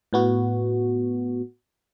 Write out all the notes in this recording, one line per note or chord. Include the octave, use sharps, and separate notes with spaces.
A2 B3 F#4